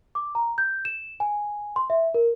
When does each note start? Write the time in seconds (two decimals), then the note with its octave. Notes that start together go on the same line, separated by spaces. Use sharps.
0.15 D6
0.35 A#5
0.58 G6
0.85 E7
1.20 G#5
1.76 C6
1.90 E5
2.14 A#4